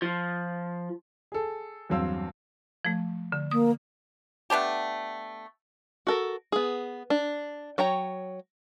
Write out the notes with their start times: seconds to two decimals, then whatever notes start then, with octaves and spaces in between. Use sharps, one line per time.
0.02 F3
1.32 G#4 A4
1.90 E2 G2 F#3 C4 F5 E6
2.85 F3 A3
3.32 D3
3.51 A#3 D#6
4.50 A3 B3 D4 G4
6.07 F#4 A4 A#4
6.52 B3 G#4
7.10 D4
7.78 F#3 C#5 G5 A#5